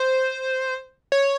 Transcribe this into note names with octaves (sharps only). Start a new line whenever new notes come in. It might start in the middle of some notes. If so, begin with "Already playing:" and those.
Already playing: C5
C#5